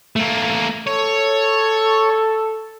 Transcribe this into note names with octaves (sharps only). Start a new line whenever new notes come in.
A3 A#3
A4 C#5